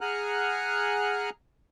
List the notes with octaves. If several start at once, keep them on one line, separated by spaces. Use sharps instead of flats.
G#4 F#5 G#5 A#5 F6 F#6